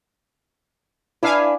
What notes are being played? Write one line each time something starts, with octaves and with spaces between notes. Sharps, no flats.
D4 E4 B4 F5 G#5